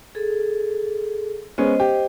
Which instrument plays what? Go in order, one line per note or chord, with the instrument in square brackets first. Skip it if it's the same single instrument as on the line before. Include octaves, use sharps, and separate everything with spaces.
[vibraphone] G#4 A4
[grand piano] G#3 B3 C#4 [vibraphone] C5 D#5
[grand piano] G4